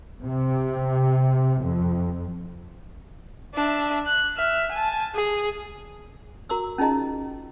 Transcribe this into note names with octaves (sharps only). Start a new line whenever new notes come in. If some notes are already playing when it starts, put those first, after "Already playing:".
C3
F2
D4 E5
F#6
E5 F6
G#5 A5
G#4
F#4 A#4 A#5 C6 D6 E6
C#4 D#4 F4 G#4 D#5 A#5